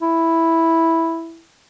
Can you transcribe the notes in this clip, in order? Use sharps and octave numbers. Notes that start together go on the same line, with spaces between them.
E4